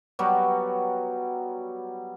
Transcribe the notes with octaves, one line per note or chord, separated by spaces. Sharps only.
F#3 G3 B3